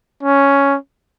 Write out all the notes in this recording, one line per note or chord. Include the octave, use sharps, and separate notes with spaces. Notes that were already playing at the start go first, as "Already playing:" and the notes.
C#4